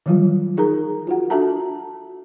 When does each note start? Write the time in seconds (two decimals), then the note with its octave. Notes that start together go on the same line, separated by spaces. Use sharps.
0.06 D#3 E3 F#3 G3 F4
0.57 D#4 G#4 A#4 A#5
1.07 F4 F#4 F#5
1.30 D4 F#4 A4 E5 A5 A#5